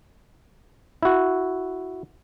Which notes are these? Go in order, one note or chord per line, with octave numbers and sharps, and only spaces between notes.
E4 F#4